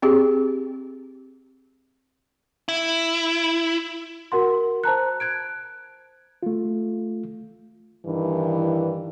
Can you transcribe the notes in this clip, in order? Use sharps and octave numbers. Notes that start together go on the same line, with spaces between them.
C4 G4 G#4
E4
F#4 A#4 F#5 C6
C5 A5 A#5 F#6
F#6 G#6 D7
A3 F4
G2 D#3 E3